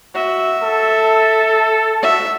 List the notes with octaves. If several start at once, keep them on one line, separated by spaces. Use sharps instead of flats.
F#4 E5
A4
F#4 E5